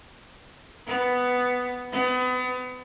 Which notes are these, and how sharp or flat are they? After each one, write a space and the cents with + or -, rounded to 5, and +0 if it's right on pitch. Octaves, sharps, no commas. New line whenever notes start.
B3 +5
B3 +35